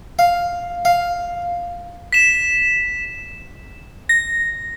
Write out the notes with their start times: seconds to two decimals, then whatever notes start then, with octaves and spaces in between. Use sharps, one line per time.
0.19 F5
0.85 F5
2.13 B6 E7
4.09 A#6